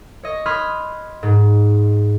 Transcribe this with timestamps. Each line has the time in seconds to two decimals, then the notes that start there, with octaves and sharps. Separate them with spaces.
0.23 C#5 D#5
0.46 B5 C6 D#6 F6 F#6 G#6
1.23 G#2